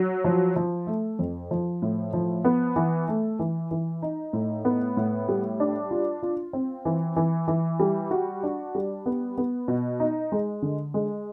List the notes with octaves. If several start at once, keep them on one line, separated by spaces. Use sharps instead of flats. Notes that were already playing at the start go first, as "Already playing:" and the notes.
Already playing: F#3
F3
F3
A3
F2
F3
A2
F3
B3
E3
A3
E3
E3
D#4
A2
B3
A2
G3
D4
F4
F4
C4
E3
E3
E3
G3
F#4
D4
G3
B3
B3
B2
D#4
G#3
D3
G#3